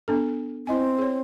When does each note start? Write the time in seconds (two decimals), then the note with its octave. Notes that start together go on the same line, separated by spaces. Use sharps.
0.08 B3 D4 A4
0.67 C4 E4 D#5 G#5
0.98 G#4 C#5